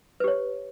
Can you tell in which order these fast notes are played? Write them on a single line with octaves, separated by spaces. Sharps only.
B4 G4 C#5